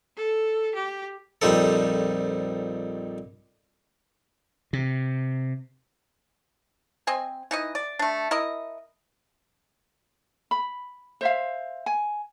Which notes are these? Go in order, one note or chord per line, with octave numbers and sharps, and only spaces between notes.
A4
G4
A#1 F2 G3 D#4 A4
C3
C4 D#5 G#5
E3 D#4 D#5
D5
A3 D4
E4 A#4 D#5
B5
C5 E5 F5
G#5